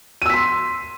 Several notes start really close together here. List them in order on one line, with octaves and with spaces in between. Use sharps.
D#7 E6 B6 C6